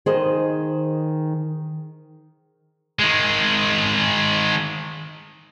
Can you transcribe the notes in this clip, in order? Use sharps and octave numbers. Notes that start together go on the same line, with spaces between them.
D#3 G#4 C5 D#5
D#3 G#3